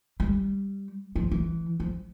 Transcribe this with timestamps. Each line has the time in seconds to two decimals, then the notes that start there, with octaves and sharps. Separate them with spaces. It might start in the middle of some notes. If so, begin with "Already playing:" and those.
0.20 G3
1.16 F3
1.31 E3
1.80 F3